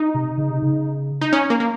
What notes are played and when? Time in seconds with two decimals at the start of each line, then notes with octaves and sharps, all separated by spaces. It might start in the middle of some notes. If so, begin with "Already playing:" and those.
Already playing: D#4
0.14 C3
0.38 C#3
0.50 C3
0.62 C#3
1.21 D#4
1.33 C#4
1.50 A#3
1.60 A#3